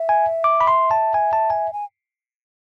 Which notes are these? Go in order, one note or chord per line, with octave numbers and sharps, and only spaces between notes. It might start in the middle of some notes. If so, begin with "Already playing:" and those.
Already playing: E5
G#5
D6
B5
C6
A5
G#5
A5
G#5
G#5